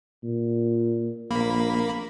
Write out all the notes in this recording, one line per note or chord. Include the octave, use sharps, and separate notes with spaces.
A#2
A#1 A#3 B5